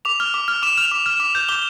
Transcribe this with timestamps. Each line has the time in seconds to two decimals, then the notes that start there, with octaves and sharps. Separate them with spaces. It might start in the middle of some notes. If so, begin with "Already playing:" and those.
0.05 D6 F7
0.20 F6
0.34 D6
0.48 F6
0.63 D6 E7
0.77 F6 F7
0.91 D6
1.06 F6
1.20 D6
1.35 G6
1.49 D6 G7